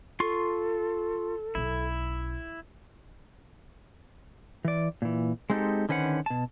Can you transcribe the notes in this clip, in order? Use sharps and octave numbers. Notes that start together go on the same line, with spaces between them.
F4 A4 C6 C#6
B1 C#4 E4
E3 D5
A#2 E3
G#3 C4 D#4 E4 G4 A4
D3 D#3 C#4 B4 C5 F#5
B2 A5